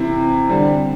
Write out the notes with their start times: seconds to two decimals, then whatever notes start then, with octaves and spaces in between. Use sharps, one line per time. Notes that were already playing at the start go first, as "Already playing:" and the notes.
Already playing: C3 E3 C4 E4
0.49 D3 G3 C4